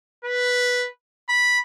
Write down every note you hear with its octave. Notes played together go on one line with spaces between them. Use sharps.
B4
B5